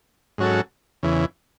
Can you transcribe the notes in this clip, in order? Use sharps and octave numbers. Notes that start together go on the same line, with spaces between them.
G#2 F#3 C#4 F#4 A4
E2 C#3 E3